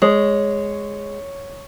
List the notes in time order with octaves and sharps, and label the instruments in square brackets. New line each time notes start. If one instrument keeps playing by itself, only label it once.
[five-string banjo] G#3 [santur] C#5